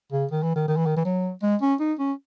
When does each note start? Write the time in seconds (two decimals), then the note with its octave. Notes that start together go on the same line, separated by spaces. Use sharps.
0.12 C#3
0.31 D#3
0.43 E3
0.56 D#3
0.68 D#3
0.77 E3
0.86 D#3
0.97 E3
1.05 F#3
1.43 G#3
1.61 C#4
1.80 D#4
1.99 C#4